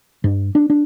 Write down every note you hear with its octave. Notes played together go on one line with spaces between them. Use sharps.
G2
D4
D4